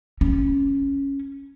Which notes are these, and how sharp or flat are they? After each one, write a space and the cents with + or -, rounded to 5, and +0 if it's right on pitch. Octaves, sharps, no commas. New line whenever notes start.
C#4 -5